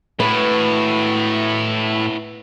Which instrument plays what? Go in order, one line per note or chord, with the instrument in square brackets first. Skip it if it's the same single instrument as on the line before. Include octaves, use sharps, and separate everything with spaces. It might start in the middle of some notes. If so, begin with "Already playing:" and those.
[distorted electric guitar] A2 [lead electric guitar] E4 F#4 [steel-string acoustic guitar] B4